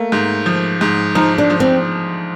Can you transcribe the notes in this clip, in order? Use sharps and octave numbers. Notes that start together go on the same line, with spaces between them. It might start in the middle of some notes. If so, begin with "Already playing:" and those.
Already playing: A3 A#3
G#2
F3
G#2
F3 D#4
D4
F3
C4